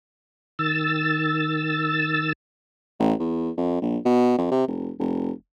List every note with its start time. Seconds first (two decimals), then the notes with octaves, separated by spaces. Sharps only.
0.59 D#3 E6 A6
2.99 A1
3.19 E2
3.57 F2
3.81 A#1
4.05 B2
4.38 F2
4.51 C3
4.68 F1
4.99 F1